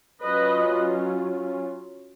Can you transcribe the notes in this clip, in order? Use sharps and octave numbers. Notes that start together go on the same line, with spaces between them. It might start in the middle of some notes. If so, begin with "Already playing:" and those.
F#3 C#4 F4 B4 D#5